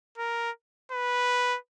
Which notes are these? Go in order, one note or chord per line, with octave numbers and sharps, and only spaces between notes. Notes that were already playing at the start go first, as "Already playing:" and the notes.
A#4
B4